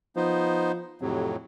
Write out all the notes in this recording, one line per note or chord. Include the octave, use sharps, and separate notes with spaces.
F3 B3 D#4 C5
F2 A2 C3 F#3